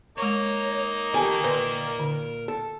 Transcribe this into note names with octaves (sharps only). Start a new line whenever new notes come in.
G#3 A#3 D#4 C#5 C#6
G4 A4 A#4 G5 G#5
A#2 B4 C6
D3
A4